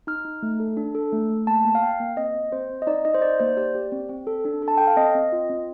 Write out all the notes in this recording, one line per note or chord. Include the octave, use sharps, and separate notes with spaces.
D#4 F6
D#4
A3
A4
D4
A4
A3
A3
A#3 A5
A#3
F5
A#3 G5
A#3
C4 D#5
C4
C4 C5
C4
D#5
D#4 D5
D#4 D#5
C5
D#4 D5
A#3 C5
G4 D5
G4
C4
C4
A4
D4
A4
A5
A4 G5
F5
C4 D#5
C4
F4
C4